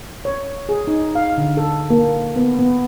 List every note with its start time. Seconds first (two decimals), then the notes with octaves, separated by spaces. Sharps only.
0.25 C#5
0.69 G#4
0.87 D#4
1.15 F5
1.38 D3
1.57 A4
1.90 A#3
2.36 B3
2.59 B3